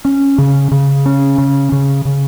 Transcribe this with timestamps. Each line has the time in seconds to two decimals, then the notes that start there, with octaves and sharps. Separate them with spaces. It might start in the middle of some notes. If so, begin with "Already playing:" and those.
0.05 C#4
0.38 C#3
0.71 C#3
1.06 C#4
1.38 C#3
1.72 C#3
2.05 C#3